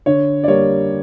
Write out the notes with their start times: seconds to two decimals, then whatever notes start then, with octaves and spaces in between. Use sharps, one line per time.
0.06 D3 C#5
0.44 D5
0.48 G3 A#3 C#5